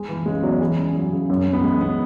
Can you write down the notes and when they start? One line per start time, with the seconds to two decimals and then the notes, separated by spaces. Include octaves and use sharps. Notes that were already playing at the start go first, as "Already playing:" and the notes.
Already playing: G#3
0.09 E3
0.26 C#3 G#3
0.43 E2 F#3
0.61 E3 G#4
0.78 C#4
0.95 F#3
1.12 C#3
1.29 F#2
1.47 C#4
1.53 B3
1.64 E3 G#3
1.81 B3